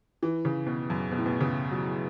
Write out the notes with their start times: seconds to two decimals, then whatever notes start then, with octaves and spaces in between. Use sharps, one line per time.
0.23 E3
0.45 C#3
0.67 B2
0.90 F#2
1.11 B2
1.18 A2
1.26 B2
1.41 C#3
1.71 F#3